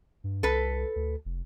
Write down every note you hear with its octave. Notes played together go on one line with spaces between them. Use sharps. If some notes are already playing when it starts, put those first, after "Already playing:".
G2
C2 A4 B4
D2
F1